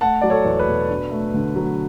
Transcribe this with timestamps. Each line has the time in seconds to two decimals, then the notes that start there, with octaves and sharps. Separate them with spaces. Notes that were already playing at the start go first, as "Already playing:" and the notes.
0.01 A3 F#5 A5
0.21 F#3 D5
0.30 A4 C#5
0.45 E2
0.60 B4
0.68 B2
0.89 D4
1.11 A3
1.34 D3
1.56 F#3